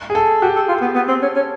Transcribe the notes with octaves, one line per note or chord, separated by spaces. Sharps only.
G#4
A4
F#4 G4
A4
F4
B3
B3
C4
C#4
C#4